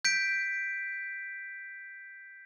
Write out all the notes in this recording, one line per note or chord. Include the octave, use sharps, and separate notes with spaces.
G6 B6 D7